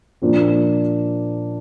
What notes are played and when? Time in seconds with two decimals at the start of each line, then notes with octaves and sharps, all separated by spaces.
0.22 A#2 F3 A#3 D4